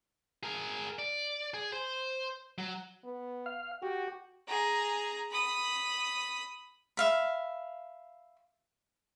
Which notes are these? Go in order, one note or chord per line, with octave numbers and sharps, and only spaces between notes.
G#4 A#4
D5
G#4
C5
F#3
B3
F5
F#4 G4
G#4 A#5
B5 D#6
E5 F5 B5